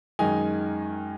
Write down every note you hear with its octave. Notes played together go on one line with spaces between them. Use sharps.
F#2 D#3 G#3 D#4 G#5